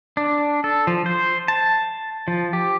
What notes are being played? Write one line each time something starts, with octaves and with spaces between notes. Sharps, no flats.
D4
A4
F3
C5
A5
F3
G4